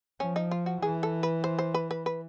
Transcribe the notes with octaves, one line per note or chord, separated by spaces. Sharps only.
F3 C#4
D#4
F4
F#4
E3 G#4
A4
B4
C5
C5
B4
B4
B4